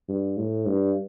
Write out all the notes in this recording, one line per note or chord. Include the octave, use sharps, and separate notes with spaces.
G2
A2
G2